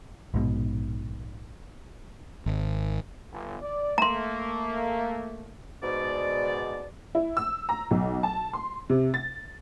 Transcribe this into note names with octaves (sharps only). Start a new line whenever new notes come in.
A#1 G#2 B2
G#1
G1
D5
A3 A#3 A#5 C6
G#2 B2 D5
E4
E6
A#5
B1
A5
C6
C3
A6